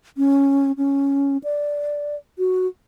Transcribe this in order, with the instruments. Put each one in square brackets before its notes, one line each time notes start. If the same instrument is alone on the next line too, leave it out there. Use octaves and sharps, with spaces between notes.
[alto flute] C#4
C#4
D5
F#4